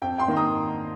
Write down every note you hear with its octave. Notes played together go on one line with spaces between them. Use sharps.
F2 G5
G5 C6
D#3 A#3 D#4
A#5 D#6